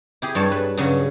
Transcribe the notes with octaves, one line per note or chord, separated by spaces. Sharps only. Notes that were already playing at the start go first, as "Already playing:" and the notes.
E4 G4 G#4
G2 G3 C#5 A5
B4
G2 C#3 F#3